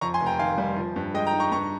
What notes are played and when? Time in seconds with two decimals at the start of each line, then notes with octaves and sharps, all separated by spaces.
0.01 F2 A#5 C#6
0.14 G#5 C6
0.20 F1
0.26 G5 A#5
0.39 D#3 F5 G#5
0.58 G3
0.77 F3
0.96 G2
1.14 G#3 D#5 G5
1.27 G5 A#5
1.33 D#4
1.40 A#5 C#6
1.52 G2 A#5 C#6